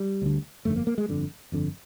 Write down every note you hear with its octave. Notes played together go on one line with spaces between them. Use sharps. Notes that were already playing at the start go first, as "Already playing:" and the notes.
Already playing: G3
D2 D3
G1 F2 D3 A3
A#3
A#3
G#3
G1 F2 D3
G1 F2 D3